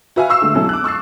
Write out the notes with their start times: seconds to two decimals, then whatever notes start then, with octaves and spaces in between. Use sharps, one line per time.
0.16 F#4 B4 E5 F5 G#5 F6
0.29 F5 C#6 E6 C7 E7
0.42 D3 G#3 A3
0.55 B2 F#3 G#3 C#4 E4 A4
0.69 D6 F#6
0.84 C#6 E6 A6 C7